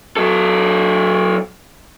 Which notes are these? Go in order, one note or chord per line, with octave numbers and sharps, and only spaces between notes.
F#3 A4